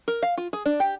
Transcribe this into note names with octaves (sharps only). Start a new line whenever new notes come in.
A#4
F5
F4
G#4
D4
G4